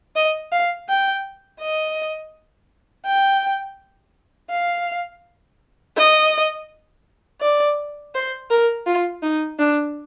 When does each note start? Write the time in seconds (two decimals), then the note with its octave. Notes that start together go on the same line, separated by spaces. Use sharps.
0.16 D#5
0.52 F5
0.89 G5
1.61 D#5
3.06 G5
4.51 F5
5.97 D#5
7.41 D5
8.15 C5
8.50 A#4
8.86 F4
9.22 D#4
9.59 D4